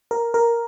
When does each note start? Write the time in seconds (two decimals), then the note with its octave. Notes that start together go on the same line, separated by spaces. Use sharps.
0.11 A#4
0.34 A#4